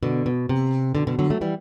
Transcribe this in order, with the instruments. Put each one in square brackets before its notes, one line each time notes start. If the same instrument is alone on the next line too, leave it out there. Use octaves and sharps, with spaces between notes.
[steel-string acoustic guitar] B2 D3
B2
C3
B2 D3
B2 D3
D3 F#3
F#3 A3
E3 G3